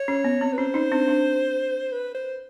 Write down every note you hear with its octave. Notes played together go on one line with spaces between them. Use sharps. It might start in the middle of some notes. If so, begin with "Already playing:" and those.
Already playing: C#5
C#4
B3
C4
B4
C#4 C5
C#4 D#4
C4 D4
C4 D4
B4
C5